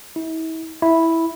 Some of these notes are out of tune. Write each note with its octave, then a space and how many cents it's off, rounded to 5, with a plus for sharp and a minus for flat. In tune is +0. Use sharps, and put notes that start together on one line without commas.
E4 -40
E4 -5